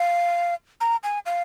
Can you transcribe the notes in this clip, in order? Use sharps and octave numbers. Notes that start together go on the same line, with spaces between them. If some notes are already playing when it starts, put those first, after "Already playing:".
Already playing: F5
A#5
G#5
F5